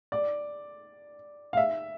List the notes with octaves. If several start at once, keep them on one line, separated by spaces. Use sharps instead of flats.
D5
F5
E5